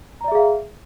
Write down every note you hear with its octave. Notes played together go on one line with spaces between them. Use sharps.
G#4 D5 E5 F5 A#5